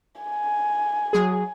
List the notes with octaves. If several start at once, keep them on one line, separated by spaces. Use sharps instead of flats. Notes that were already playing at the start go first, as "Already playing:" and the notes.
G#5
F#3 G#4